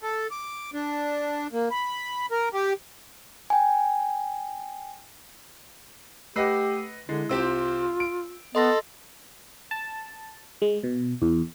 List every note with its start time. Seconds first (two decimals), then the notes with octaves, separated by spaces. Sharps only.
0.03 A4
0.31 D6
0.74 D4
1.53 A#3
1.71 B5
2.31 A#4
2.54 G4
3.50 G5 G#5
6.36 A3 G4 B4 D#5 F#5 E6 C7
7.09 D3 G#3 E4
7.29 C2 C4 F4 G4 E6
8.00 D7
8.55 B3 A4 D#5 C6 A#6
9.71 A5
10.62 G#3
10.84 B2
11.22 E2